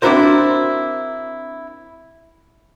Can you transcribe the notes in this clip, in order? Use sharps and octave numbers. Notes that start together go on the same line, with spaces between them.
C4 D4 E4 F#4 A#4 C5